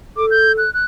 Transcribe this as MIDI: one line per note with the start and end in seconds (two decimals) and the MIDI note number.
0.17 0.63 69
0.17 0.26 86
0.30 0.52 91
0.58 0.73 90
0.74 0.86 90